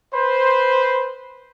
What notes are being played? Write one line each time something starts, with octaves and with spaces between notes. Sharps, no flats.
B4 C5